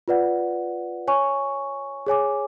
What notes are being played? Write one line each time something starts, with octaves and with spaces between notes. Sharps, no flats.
F4 B4 D5 F#5
C#5 G#5 C#6
G#4 C#5 G#5 D6